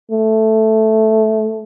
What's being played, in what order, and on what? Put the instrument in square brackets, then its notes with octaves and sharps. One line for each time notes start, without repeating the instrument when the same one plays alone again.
[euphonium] A3